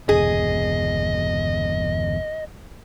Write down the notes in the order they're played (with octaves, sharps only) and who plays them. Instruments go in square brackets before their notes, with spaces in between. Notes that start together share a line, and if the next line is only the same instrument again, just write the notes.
[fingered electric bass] G1 E2 B2 [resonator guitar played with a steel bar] G#4 [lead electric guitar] D#5